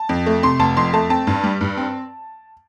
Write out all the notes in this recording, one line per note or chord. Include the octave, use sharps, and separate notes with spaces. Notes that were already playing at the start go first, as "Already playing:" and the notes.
Already playing: A5
F2
A3
C3 C6
F1 A5
F2 C6
A3 A5
C4 A5
G2
G3
G2
C4